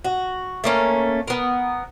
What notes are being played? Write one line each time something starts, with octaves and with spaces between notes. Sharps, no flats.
F#4
A3 A#3 C#4
B3 A#4